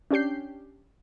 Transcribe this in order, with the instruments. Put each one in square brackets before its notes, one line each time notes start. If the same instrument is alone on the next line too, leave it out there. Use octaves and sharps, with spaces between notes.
[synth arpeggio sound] C#4 D4 G4 G6 C7